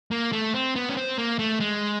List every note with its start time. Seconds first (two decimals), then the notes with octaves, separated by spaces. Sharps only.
0.11 A#3
0.32 A3
0.54 C4
0.76 B3
0.89 C#4
0.97 C4
1.18 A#3
1.39 A3
1.60 G#3